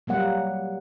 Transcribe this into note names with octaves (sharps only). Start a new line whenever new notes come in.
F#3 G3 A#3 F#5